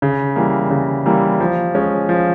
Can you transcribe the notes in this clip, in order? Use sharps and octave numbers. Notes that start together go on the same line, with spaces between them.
C#3
E3 G3 A#3
C#3
E3 G3 A#3
F3
G#3 C#4
F3